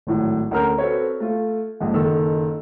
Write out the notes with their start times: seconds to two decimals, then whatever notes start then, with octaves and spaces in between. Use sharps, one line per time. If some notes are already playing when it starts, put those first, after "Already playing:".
0.07 G#1 A2 F#3
0.51 D2 C#4 A#4 A#5 F6 G6
0.78 C4 F#4 A4 B4 C#5
1.20 A3 F4
1.80 A#1 F2 G#2
1.93 F#1 D#3 A4 E6